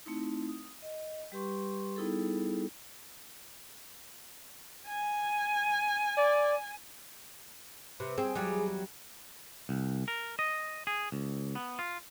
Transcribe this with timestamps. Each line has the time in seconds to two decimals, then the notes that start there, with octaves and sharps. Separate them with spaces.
0.05 A3 C4 D#4 E4
0.48 D#6
0.82 D#5
1.32 G3 G4 B4 C6 C#6
1.96 G3 B3 D#4 E4 G#4 A4
4.88 G#5
6.18 D5
8.00 C3 B4
8.18 C4 G#4
8.35 E2 F#3 G3
9.69 C2
10.08 A#4
10.39 D#5
10.87 G#4
11.12 C#2
11.55 B3
11.79 F4